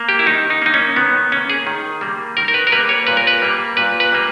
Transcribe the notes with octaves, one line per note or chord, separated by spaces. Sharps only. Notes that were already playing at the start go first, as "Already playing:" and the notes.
Already playing: A#3
G4
E4
D#3 D#4
D#4
A#3 D#4
C#4
D#3 B3
A#3 C#4
G#4
D#3
G3 A#3
D#3 A#4
A#4
B4
A#4
G3 A#3 B4
C#5
A#2 B4
A#4
B4
G3 A#3
A#2 B4
B4
G3 A#3